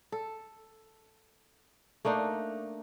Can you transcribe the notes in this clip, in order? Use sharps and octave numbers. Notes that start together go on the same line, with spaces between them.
A4
A3 A#3 D4 D#4